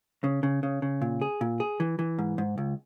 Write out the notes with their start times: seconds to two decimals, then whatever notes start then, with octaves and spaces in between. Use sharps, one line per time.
0.24 C#3
0.43 C#3
0.63 C#3
0.82 C#3
1.02 A#2
1.21 G#4
1.41 A#2
1.60 G#4
1.80 E3
1.99 E3
2.18 G#2
2.38 G#2
2.58 C#2